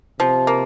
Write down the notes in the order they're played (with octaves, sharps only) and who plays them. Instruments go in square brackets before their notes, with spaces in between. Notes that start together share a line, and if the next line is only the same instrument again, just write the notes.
[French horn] C3 [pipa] F3
[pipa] A#3